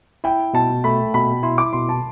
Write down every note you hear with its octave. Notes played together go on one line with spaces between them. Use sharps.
E4 G5
B2 A5
A3 B5
B2 B5
E4 C6
D6
B2 C6
A5